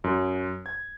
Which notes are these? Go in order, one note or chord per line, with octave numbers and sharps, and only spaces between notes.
F#2
G#6